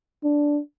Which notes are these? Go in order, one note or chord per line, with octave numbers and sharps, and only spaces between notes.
D4